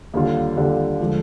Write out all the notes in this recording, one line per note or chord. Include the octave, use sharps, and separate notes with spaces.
D#2 D3 G3 D4 F4
D#2 D3 G3 D4 F4
D3 F3 G#3